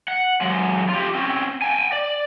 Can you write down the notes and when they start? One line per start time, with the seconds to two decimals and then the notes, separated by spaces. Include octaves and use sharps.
0.08 F#5
0.41 F#3 G#3
0.90 F4 G4
1.15 C4 C#4
1.62 G5 G#5
1.92 D5